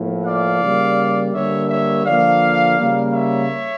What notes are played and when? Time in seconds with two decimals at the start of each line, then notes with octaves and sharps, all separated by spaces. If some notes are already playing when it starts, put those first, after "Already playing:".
Already playing: A2 F3 A#3
0.25 D5 F5
0.62 C#3 G3 A#3
1.34 D3 G3 A#3 C#5 E5
1.69 C#5 E5
2.06 D3 F3 A#3 D5 F5
2.78 C#3 G3 A#3
3.13 C#5 E5